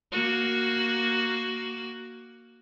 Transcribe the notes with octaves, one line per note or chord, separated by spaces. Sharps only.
A#3 F#4